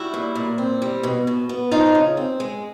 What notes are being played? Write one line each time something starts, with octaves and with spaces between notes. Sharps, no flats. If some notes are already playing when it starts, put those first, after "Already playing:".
Already playing: G3 E4 F#4
A#2
A#2
C4
G3
B2
B2
B3
F3 D#4 F4
C#3
C4
G#3